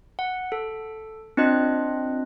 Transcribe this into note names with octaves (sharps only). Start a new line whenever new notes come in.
F#5
A4
C4 D4 F4 D#5 F#6